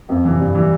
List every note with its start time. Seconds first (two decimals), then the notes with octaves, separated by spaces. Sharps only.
0.09 F2
0.25 C3 E3
0.40 G2
0.55 E3 G3 D4